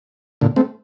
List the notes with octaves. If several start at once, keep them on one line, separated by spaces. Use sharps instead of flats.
A#2 D3
A3 C4